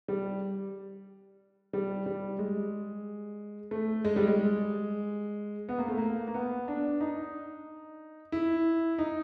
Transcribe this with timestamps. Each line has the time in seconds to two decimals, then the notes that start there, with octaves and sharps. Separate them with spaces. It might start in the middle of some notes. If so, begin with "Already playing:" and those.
0.08 G3
1.73 G3
2.06 G3
2.39 G#3
3.71 A3
4.05 G#3
4.16 G3
4.27 G#3
5.69 B3
5.78 A#3
5.88 A3
5.97 A#3
6.27 A#3
6.34 B3
6.68 D4
7.01 D#4
8.32 E4
8.99 D#4